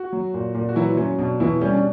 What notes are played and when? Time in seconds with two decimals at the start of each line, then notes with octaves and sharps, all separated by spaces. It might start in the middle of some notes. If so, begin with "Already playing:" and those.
Already playing: F#4
0.13 F#3
0.34 A#2
0.55 A#2
0.69 F#4
0.76 E3 F#3 E4
0.97 F#3 C#4
1.19 B2 D4
1.40 B2 E3 E4
1.61 G3 C#4
1.73 D4